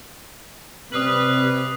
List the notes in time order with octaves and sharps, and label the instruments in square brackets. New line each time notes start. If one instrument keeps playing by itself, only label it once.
[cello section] C3 [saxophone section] G3 B4 [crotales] D#6 C7 F#7